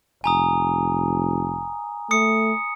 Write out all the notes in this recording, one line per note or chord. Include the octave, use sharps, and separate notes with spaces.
F1 G#5 A#5 D#6
A3 D#6 C#7